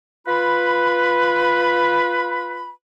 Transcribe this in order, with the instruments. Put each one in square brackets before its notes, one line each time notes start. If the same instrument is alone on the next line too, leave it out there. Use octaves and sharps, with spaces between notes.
[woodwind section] F4 B4 B5